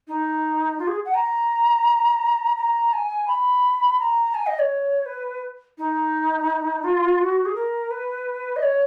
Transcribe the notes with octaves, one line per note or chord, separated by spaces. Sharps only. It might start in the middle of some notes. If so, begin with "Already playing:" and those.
D#4
F4
G#4
F#5
A#5
A#5
G#5
B5
A#5
G#5
D#5
C#5
B4
D#4
F4
F#4
G#4
A#4
B4
D#5
C#5